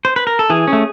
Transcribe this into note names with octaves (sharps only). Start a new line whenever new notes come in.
C5
B4
A#4
A4
E3 G#4
C#4
A3